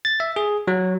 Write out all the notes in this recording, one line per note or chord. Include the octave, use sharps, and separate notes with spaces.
A6
E5
G#4
F#3